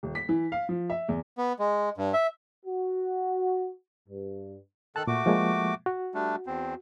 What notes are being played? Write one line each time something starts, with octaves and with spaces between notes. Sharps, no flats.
D#1
B6
E3
F5
F3
E5
E2
B3
G#3
G2
E5
F#4
G2
D#3 A4 A5 F#6
A#2 A3 F#4 D6
F3 G#3 A#3
F#4
G3 A3 D4
E2 C4